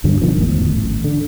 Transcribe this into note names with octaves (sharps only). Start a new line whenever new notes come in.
D2 G2 D3 F#3
B2 D3 D#3 F3
D1 G#1 E2 A2
A1
D3